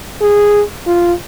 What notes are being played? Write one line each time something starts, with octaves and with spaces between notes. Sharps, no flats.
G#4
F4